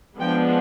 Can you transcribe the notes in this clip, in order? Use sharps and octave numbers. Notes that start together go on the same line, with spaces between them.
F3 G#3 B3 D4 G5